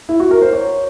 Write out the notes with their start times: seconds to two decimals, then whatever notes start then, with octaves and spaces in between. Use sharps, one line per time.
0.09 E4
0.20 F#4
0.31 A#4
0.42 C5
0.53 C#5